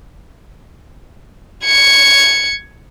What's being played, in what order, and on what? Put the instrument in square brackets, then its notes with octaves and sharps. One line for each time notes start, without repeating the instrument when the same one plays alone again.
[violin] G#6 C#7